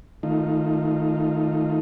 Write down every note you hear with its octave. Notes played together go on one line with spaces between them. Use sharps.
D#3 A3 D#4 F4